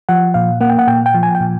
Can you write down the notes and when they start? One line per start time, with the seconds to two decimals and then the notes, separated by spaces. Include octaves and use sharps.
0.09 F3 F#5
0.34 A#2 F5
0.61 A#3 F#5
0.69 G5
0.79 F#5
0.88 A#2 G5
1.06 G5
1.14 F3
1.23 G#5
1.35 G5
1.41 A#2